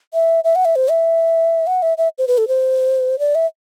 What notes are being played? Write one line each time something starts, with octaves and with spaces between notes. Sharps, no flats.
E5
E5
F#5
E5
C5
E5
F#5
E5
E5
C5
B4
A4
C5
D5
E5